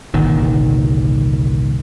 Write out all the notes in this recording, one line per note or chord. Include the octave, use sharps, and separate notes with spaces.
G1 C2 A#2 D#3